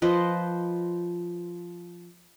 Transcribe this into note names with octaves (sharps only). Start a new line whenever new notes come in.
F3 B4 C5 D#5